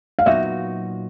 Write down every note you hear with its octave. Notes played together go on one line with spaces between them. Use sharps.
F5
A#2 F#3 B3 D#4 F#4 E5